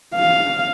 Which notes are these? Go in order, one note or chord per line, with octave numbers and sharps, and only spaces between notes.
F5